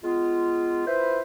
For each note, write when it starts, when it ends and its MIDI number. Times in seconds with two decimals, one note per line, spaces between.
0.03 0.83 56
0.03 0.83 59
0.03 0.83 65
0.86 1.21 64
0.86 1.21 65
0.86 1.21 71
0.86 1.21 72